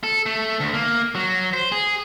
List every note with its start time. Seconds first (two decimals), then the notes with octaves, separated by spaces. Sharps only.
0.03 A4
0.26 A3
0.60 D2
0.74 A#3
1.15 F#3
1.53 C5
1.72 G#4